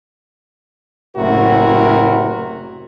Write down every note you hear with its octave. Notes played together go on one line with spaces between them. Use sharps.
F#1 A2 C3 E4 F#4 A#4